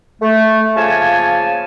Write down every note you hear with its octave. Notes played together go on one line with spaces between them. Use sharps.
A3
C#3 F3 A#3 C#5 G#5 A5